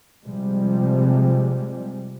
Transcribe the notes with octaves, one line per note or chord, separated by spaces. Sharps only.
C3 F3 G3 G#3